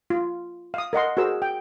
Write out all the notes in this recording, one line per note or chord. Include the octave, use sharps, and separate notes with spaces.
F4
F5 D#6
A#4 D#5 F#5 C6
F#4 G#4 A#4 C5 E6
G5